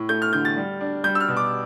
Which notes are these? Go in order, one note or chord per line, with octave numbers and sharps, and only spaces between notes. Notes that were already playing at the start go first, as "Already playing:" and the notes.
Already playing: A2
A3 G6
F6
D3 G6
A6
G3
D4
G3 G6
E6
F6
B2
D6